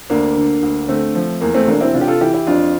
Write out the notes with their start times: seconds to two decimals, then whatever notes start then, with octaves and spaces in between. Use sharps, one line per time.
0.10 D2 A#3 D4
0.36 D3
0.62 D2
0.88 D3 A3 C4
1.15 F3
1.41 E2 A#3
1.54 A3 C4
1.67 E1 A#3 D4
1.81 C4 E4
1.94 C3 D4 F4
2.01 G4
2.07 F4 A4
2.20 E3 E4 G4
2.34 E4 G4
2.47 F2 D4 F4